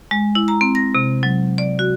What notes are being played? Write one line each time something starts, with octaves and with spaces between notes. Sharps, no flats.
G#3
E4
A#5
C4
A#6
C3
F#3
D5
F#4